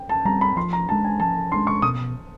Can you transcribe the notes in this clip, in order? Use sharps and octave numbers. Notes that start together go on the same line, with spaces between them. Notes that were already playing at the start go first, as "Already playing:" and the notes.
Already playing: G5
A5
G3 C4 A#5
B5
F3 C6
A#5
G#3 B3 D4 A5
G#5
F3 A5
G#3 B3 D4 C6
C#6
B2 D#6